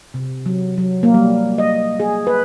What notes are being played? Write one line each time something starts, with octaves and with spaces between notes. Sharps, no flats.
C3
F#3
F#3
A#3
G3
D#5
G#4
B4